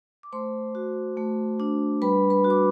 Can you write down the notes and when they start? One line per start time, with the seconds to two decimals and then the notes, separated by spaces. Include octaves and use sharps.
0.23 D6
0.32 A3 C5 C6
0.75 F#4
1.17 A3
1.60 D4
2.02 G3 B4 B5
2.30 B4 B5
2.44 F#4
2.50 D6